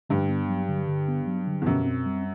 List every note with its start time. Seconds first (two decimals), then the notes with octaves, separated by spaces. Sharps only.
0.10 G2 D3
0.29 B3
0.49 F#3
0.68 D3
0.88 D3
1.08 B3
1.27 F#3
1.47 D3
1.61 E2
1.66 F#2 B2
1.86 C4
2.06 G3